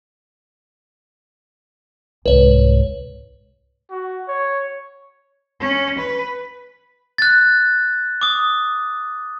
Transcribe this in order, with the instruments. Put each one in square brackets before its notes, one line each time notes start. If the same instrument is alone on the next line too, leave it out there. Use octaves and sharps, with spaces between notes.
[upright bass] C2 G#2 [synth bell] B4 C#5
[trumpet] F#4
C#5
[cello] C#4
B4
[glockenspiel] F#6 A6
D6 D#6